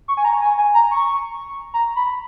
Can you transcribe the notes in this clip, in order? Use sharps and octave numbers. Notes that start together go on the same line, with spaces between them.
C#6
G#5
A#5
G#5
G#5
A#5
C#6
A#5
B5